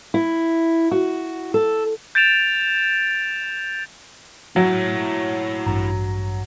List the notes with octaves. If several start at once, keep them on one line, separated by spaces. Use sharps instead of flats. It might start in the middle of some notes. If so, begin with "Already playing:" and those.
E4
F#4
A4
G6 A6 D7 E7 F7
F#3 E4 C#5
A1 G2 A#5